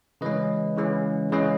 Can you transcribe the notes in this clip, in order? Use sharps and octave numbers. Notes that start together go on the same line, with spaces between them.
C#3 E3 G#3 C#4 B4 D#5
C#3 E3 G#3 C#4
C#3 E3 G#3 C#4 B4 D#5